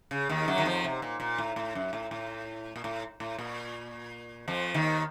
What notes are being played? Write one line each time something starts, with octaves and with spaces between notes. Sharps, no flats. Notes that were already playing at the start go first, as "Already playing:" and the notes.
C#3
D#2 D#3
F#2 F#3
D#3
F2 F3
C3
A#2
A#2
A2
A2
F#2
A2
A2
A#2
A2
A2
A#2
F2 F3
D#2 D#3